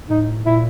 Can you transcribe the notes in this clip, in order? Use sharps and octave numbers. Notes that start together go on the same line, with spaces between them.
A2 D#4
A#2 E4